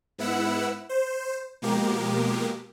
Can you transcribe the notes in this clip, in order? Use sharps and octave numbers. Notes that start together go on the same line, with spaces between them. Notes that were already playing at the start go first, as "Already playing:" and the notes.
G#2 B3 E4 F#5 B5 E6
C5
B2 F3 G#3 A#3 G4 A#4